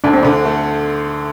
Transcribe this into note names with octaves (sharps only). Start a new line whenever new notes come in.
D2 D4
C4
D3 D4
A3